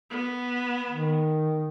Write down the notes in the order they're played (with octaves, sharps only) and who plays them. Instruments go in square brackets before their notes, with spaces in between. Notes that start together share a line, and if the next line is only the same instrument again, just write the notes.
[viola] B3
[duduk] D#3